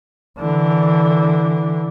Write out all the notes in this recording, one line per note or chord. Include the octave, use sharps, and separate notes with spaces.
D3 E3